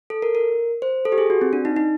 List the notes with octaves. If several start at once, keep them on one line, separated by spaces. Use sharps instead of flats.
A4
A#4
A#4
C5
A4
G4
G#4
F#4
C4
D4
D#4
D#4